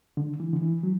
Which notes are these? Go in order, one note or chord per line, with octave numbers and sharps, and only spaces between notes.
D3
E3
D3
E3
F#3